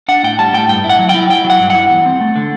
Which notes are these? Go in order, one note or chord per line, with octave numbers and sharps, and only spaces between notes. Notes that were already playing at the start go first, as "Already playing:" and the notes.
D4 F#5
A2 G5
G3 A5
A2 G5
G2 G5
E4
F#5
F#3
G5
E4
E4 G5
F#3
F#5
G2
E4 F#5
E2
C4
A3
D3